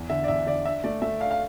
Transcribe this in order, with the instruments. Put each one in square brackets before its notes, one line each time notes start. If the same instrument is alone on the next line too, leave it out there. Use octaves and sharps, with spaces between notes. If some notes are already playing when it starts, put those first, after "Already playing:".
Already playing: [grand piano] E2
D3 E5
D5
E2 E5
D3 D5
D4 E5
A3 D5
A3 E5
D4 F5
F5